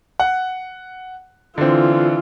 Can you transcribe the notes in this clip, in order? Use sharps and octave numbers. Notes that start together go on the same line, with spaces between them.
F#5
D3 E3 C4 F4